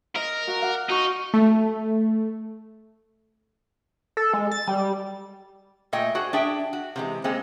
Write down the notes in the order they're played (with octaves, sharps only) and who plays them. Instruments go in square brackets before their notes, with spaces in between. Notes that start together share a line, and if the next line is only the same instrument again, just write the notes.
[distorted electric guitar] A#4 [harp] D#5
[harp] F#4 F5
F5 F#5 D6
[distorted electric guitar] D#4 [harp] F#4 C#6 F6
[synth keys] A3
[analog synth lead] A4
G#3
A6
G3
[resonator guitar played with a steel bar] A#2 A3 D#5 G5
D4 F#4 G#4 C5
D4 G#4 E5 G5
F#4
C3 E3 G#3
G#3 A#3 C4